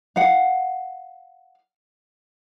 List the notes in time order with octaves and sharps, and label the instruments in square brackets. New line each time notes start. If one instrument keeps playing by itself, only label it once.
[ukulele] F5 F#5